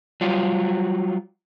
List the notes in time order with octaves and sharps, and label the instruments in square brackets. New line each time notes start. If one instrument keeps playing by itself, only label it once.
[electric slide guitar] F#3 G3 F4